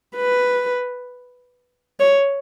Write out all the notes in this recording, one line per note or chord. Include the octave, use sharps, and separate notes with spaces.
B4
C#5